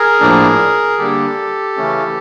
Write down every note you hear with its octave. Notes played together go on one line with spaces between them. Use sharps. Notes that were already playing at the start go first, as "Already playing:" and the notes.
Already playing: G#4 A#4
A2 F3 A#3 D4
D3 G3 A#3 D4 G4 A4
C#3 E3 A3 C#4